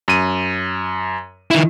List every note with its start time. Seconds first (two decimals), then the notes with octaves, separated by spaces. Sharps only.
0.08 F#2 D#7
1.51 D#3 E4